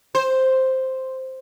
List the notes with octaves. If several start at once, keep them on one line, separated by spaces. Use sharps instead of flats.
C5